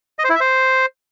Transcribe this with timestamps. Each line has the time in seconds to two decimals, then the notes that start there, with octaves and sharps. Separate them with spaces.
0.19 D#5
0.24 C5
0.30 E4
0.35 E5
0.41 C5